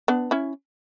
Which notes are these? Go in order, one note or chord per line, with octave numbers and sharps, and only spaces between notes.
B3 D4
C#4 E4